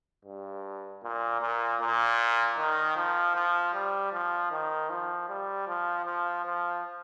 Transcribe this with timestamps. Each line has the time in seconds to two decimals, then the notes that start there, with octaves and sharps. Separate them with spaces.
0.25 G2
1.03 A#2
1.41 A#2
1.81 A#2
2.58 D#3
2.96 F3
3.35 F3
3.74 G3
4.13 F3
4.51 D#3
4.90 F3
5.29 G3
5.67 F3
6.06 F3
6.45 F3